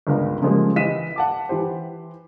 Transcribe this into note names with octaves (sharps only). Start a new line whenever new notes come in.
G1 C#2 A#4 F5
C#3 F3 G3 G#3 A#3
E3 G4 D#5 B6 D#7 E7
F#5 A5 D6
E3 G4 C5